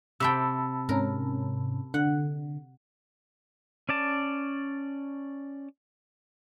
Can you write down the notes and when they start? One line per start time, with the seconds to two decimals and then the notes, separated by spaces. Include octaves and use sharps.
0.20 C3 E5 G5 A5 B5 E6
0.89 G#2 C3 C#4 A#4
1.94 D3 F#5
3.89 C#4 D5 A5